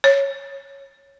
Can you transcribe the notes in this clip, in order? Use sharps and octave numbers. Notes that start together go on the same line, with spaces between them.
C#5